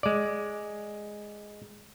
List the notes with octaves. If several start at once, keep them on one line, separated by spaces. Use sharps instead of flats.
G#3 D5